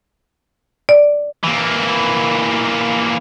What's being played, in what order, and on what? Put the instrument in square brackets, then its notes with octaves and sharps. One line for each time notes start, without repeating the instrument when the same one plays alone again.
[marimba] D5
[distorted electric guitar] E3 A#3